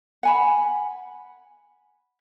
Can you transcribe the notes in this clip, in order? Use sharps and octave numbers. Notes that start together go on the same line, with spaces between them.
F#5 G#5 B5